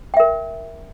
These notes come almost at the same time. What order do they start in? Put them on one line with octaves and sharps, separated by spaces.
G5 E5 A#4